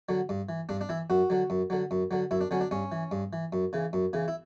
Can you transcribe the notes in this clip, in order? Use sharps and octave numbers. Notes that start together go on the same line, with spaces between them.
D3 F#3
G2
E3
G2 D4
D4
E3 E4
F#2 F#4
D3 F#3
F#2
D3 F#3
F#2
D3 F#3
F#2 E4
D4
D3 F#3 C#4
D4
G2 C#4
E3
G2
E3
F#2
C#3 E3
F#2
C#3 E3
E4